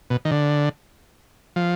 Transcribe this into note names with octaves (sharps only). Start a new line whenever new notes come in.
B2
D#3
D3
F3